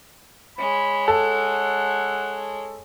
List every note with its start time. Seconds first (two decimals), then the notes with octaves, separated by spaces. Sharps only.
0.59 G#3 C#5 B5
1.08 A4 F#5